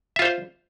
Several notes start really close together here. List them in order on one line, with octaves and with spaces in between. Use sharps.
E5 F4 C5